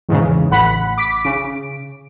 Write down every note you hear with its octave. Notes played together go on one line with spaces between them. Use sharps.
E2 G#2 C#3
A1 F#5 B5
D6 B6
C#3 D7